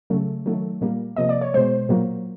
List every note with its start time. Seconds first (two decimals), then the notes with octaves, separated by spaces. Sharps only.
0.10 C#3 F#3 A3
0.46 D#3 F#3 A3
0.81 A#2 G3 A#3
1.16 C3 F3 A#3 D#5
1.29 D5
1.41 C#5
1.54 B2 G#3 C5
1.89 A#2 F#3 A#3